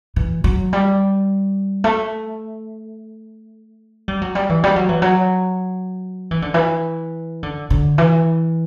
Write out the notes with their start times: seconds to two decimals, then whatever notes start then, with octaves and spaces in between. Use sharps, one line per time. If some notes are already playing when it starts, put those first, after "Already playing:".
0.16 E3
0.44 F#3
0.73 G3
1.84 A3
4.08 G3
4.22 F#3
4.35 G3
4.49 E3
4.64 G3
4.76 F#3
4.89 E3
5.02 F#3
6.31 E3
6.42 D3
6.54 E3
7.43 D3
7.70 D3
7.98 E3